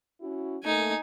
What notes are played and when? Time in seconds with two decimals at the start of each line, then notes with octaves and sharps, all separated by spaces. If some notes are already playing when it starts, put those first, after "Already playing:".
0.21 C#4 E4 F#4
0.64 A3 A#3 D#4 G#5